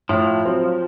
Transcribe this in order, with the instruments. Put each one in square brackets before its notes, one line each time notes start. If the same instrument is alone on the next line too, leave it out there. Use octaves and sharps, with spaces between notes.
[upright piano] A2 [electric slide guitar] F3
[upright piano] F#3 C4